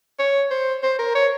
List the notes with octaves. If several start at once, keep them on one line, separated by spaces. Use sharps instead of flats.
C#5
C5
C5
A#4
C#5